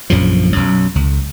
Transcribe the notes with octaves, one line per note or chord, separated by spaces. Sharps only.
A#1 F#2 C#3 F3
B1 F#2
C#2